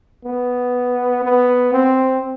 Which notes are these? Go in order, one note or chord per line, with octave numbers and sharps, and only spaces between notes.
B3
B3
C4